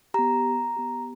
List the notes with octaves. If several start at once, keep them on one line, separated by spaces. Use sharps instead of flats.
B3 G4 A#5
B3 G4